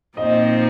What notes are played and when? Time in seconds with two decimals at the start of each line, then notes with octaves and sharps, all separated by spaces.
0.17 A#2 F3 C4 D#4 D#5